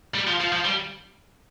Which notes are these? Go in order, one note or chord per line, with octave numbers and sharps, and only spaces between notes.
G3
F3
F3
F3
G3